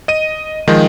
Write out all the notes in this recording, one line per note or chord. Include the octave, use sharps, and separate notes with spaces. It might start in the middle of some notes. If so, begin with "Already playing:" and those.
D#5 D#7
D#3 F3 G#3 D#4